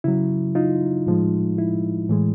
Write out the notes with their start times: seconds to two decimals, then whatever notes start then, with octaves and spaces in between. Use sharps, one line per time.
0.04 C#3 F#3 E4
0.55 D#4 F4
1.07 A2 F3 G#3
1.58 E4
2.10 A2 E3 G#3